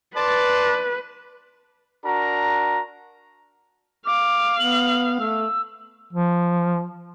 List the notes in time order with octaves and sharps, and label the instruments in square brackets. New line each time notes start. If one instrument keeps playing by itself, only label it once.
[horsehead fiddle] B4 [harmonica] D5 A5 C6
[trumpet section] D4 F#4 A#4 A#5
[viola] F5 [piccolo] D6
[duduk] B3 [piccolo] F#7
[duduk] A3 [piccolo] E6
[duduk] F3